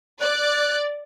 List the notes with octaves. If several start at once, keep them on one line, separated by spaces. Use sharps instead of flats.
D5 F#6